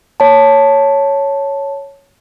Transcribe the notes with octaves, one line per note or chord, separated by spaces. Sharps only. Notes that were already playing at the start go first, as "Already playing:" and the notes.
C#5 A5